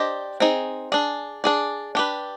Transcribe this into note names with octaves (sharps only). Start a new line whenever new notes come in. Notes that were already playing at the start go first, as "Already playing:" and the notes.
Already playing: D4 G4 C5 D#5
C4 D#4 G#4
D4 G#4 D5
D4 G#4 D5
D4 G4 B4